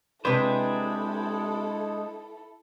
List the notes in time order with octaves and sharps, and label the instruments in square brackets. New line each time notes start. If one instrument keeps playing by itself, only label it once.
[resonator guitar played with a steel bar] C3 B4 [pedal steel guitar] G#3 D4 C5 [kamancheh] E4 A4